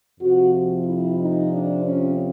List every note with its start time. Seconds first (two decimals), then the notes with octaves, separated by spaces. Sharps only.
0.21 F2 C3 F3 F#4
0.86 E4
1.18 D#4
1.52 D4
1.84 C#4